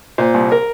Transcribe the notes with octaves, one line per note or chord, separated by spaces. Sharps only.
A#2 C5
C2
A#4